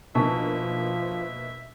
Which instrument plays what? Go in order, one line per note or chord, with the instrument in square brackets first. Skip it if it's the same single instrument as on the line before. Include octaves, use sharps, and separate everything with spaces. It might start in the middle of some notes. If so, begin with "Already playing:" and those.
[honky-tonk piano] B2 A#3 B6 [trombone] F3 [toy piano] D4 D#4 G4 [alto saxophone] E5